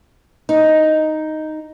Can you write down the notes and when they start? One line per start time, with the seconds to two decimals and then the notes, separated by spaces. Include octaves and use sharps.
0.49 D#4